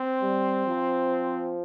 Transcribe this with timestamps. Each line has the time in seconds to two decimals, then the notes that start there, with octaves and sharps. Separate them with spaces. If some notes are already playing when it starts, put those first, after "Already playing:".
Already playing: C4
0.22 G3
0.67 F3